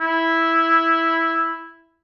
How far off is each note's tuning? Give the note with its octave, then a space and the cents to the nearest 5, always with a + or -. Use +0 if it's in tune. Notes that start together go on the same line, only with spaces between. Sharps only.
E4 -5